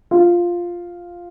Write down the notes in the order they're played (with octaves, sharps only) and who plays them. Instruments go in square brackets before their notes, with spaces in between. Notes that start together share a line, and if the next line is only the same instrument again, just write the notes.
[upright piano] F4